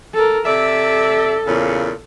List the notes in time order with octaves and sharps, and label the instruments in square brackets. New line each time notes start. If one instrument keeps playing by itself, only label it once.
[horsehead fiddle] A4 A#4
[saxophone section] C3 D5 E5 [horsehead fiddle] A4
[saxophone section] E2 A#2 C#3